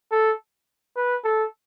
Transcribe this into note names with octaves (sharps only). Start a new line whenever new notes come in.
A4
B4
A4